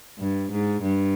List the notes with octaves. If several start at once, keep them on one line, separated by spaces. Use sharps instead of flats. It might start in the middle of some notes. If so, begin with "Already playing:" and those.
G2
G#2
G2